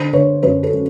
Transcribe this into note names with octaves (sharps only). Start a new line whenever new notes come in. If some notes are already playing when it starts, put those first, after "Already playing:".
Already playing: D3 C5
D3 B4 C#5
F#2 B4 C#5
A4 B4
F#3